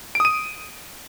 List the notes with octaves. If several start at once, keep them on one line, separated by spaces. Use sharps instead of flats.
D#6 D7 D#7